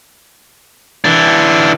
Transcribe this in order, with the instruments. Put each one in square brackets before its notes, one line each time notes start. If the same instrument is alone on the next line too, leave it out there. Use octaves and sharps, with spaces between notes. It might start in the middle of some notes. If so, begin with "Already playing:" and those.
[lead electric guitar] E3 D4